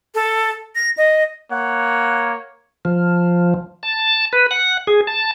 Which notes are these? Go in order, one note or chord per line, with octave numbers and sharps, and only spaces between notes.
A4
A#6
D#5
A#3 C#5 F#5
F3
A5
B4
F#5
G#4
A5